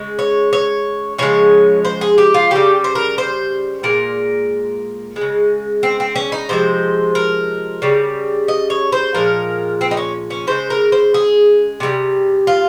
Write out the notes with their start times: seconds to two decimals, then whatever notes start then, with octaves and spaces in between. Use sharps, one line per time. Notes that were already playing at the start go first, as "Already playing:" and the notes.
Already playing: C#3 G#3
0.19 C#5
0.53 C#5
1.18 C#3 F3 G#3 C#5
1.85 C5
2.01 G#4
2.18 G4
2.34 F4
2.51 C#3 G3 G4
2.84 C5
2.95 A#4
3.18 C5
3.83 A#2 G#3 A#4
5.16 G#3
5.21 C#3
5.83 C4
6.00 C4
6.16 C#4
6.32 D#4
6.49 C3 F3 G#3 C5
7.15 A#4
7.82 C#3 G3
8.48 D#5
8.70 C#5
8.92 C5
9.14 A#2 F3 G#3 A#4
9.81 C4
9.91 D#4
9.97 C#4
10.30 C#4
10.47 C#3 G#3 C5
10.70 A#4
10.92 C5
11.14 G#4
11.80 C3 D#3 G3
12.47 F4